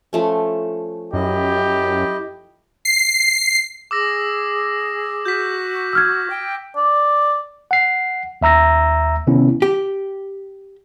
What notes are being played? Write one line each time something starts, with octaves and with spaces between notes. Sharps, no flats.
F3 A3 C#4
F#2 E4 G4 D#5
C7
G#4 D6 E6 A#6
F#4 G6 B6
E6 F6 G#6
G5
D5
F#5 C7
D#2 E5 A#5 E6 A#6
C3 D#3 B3 C#4 E4
G4